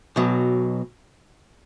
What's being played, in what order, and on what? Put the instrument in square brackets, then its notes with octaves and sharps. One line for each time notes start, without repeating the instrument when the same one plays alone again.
[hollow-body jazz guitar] B1 B2 F#3